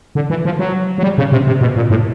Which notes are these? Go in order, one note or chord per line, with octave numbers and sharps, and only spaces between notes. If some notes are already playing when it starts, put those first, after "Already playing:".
D3
E3
F3
F#3
F#3
G3
C#3
C3
C3
B2
A#2
A2